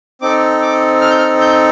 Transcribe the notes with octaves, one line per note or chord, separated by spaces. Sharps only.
C4 D#4 A4 D6
D6
F6
G6
F6
G6